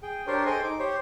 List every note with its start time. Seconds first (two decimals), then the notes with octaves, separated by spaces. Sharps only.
0.03 G#4 G5
0.27 D4 G4 A#4 C5 C#5
0.46 G#4 A4 C5 D#5 G5 G#5
0.63 D#4 D6
0.79 G4 C5 C#5